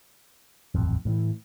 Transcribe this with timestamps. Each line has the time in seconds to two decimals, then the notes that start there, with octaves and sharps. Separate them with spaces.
0.75 D#1 A1 F2
1.05 A2 D#3 E3